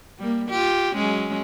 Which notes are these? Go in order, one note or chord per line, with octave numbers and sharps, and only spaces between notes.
G3 A#3
F4 G4
F#3 G#3 C#4